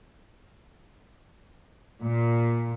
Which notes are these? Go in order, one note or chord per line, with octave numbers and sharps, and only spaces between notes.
A#2